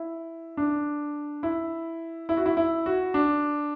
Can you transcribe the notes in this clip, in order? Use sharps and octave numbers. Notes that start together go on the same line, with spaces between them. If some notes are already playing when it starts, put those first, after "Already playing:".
Already playing: E4
D4
E4
E4
F#4
E4
E4
F#4
D4